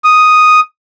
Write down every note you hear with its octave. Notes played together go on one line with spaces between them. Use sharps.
D#6